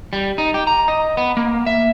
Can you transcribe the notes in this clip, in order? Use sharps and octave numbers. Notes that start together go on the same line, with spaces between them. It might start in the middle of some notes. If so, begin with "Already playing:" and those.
G3
D#4
G4
A#5
D#5
B3
A#3
E5